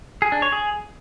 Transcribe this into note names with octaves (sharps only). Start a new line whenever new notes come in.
G#4
D4
C#5
G#4